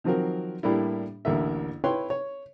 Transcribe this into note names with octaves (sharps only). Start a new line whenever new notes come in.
D#3 F3 F#3 C4 F#4 A#4
A2 G3 A#3 D4 E4
A1 D2 A#3 E5
E4 B4 C#5 G5 C6
C#5